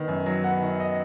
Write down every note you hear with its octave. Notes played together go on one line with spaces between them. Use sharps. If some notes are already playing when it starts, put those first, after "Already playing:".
Already playing: D#3 B3
F#2
F#3
B3 F#5
D#3
D#5